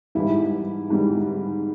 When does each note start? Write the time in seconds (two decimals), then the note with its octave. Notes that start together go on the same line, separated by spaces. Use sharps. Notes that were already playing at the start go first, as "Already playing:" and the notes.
0.15 G#2 E3 G3 E4
0.90 G#2 E3 G3